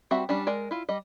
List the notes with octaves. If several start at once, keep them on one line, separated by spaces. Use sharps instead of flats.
G3 C4 F#4 E5 F#5
G3 C#4 D4
G#3 A#4 D5
E4 F4
G3 D#5